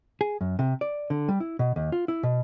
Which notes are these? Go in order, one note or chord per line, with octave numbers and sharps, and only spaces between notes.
G#4
F#2
C3
D5
D3
G3
E4
B2
D#2
F4
E4
B2